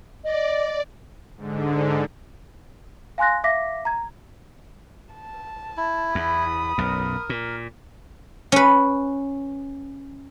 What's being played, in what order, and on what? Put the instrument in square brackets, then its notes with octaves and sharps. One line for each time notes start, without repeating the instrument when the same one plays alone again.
[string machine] D5 [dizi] D#5
[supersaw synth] G#2 D3
[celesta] F5 G#5 C6 F#6 A#6
E5 F5 D6 A#6 B6
A#5 G#6
[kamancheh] A5
[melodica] E4
[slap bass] E2 [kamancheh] B5 D#6
[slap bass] B1 F#2 [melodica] A#4
[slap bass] A#2
[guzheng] C#4 B4